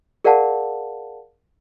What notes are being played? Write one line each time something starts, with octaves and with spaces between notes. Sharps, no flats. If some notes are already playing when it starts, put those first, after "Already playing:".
G#4 A#4 D5 F5 F#5 A5